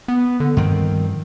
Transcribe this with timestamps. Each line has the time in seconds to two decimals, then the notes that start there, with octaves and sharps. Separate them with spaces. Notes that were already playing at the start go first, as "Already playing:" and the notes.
0.08 B3
0.40 D3
0.57 G2 D#3 F3 C4